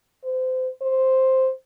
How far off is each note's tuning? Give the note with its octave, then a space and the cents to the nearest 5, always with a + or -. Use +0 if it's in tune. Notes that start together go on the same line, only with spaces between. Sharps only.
C5 -30
C5 +5